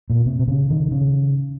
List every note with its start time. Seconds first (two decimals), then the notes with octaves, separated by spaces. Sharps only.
0.10 A#2
0.26 C3
0.39 C3
0.48 C#3
0.70 D#3
0.91 C#3